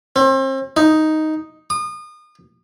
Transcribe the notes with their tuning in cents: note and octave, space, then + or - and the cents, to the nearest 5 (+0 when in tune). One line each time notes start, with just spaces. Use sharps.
C4 +35
D#4 +5
D#6 -35